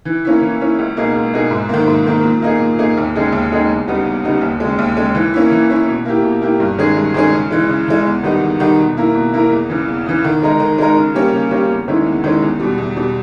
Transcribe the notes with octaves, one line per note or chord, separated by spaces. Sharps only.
E3
A#3 C#4 E4
E3
A#3 C#4 E4
C#2
B2 A#3 D#4 G#4
C#2
B2 A#3 D#4 G#4
G#2
D#3 A#3
G#2
D#3 A#3
A#2
A#3 D#4 G#4
A#2
A#3 D#4 G#4
D#2
C#3 G#3 D#4 G#4
D#2
C#3 G#3 D#4 G#4
E2
C#3 G3 B3 D#4
E2
C#3 G3 B3 D#4
D#2
C#3 G#3
D#2
C#3 G#3
E3
A#3 C#4 E4
E3
A#3 C#4 E4
B2
A#3 E4 G4
B2
A#3 E4 G4
G2
D#3 G#3 C#4 G#4
G2
D#3 G#3 C#4 G#4
C#3
E3 G#3
C#3
E3 G#3
E2
D#3 G3 B3 D#4
E2
D#3 G3 B3 D#4
B2
A#3 E4 A#4
B2
A#3 E4 A#4
E2
C#3 E3
E2
C#3 E3
D#3
G#3 D#4 A#4
D#3
G#3 D#4 A#4
C#3
G3 A#3 C#4 G4
C#3
G3 A#3 C#4 G4
E2
D#3 G#3 C#4 E4
E2
D#3 G#3 C#4 E4
E2
B2 G3
E2
B2 G3